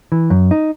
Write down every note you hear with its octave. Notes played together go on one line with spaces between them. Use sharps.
E3
F#2
D#4